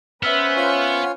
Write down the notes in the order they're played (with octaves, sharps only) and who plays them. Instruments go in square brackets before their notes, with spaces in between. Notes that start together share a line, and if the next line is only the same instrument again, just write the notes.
[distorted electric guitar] B3 [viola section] C#4 B4 C5 [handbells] E5 E6 F6
[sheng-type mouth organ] F4 C#5 G#5